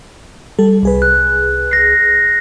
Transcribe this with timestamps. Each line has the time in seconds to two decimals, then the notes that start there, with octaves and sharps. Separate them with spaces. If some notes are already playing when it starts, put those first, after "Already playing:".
0.59 G3 A4
0.83 C2 G#4 B4
1.02 F#6
1.71 A#6 C7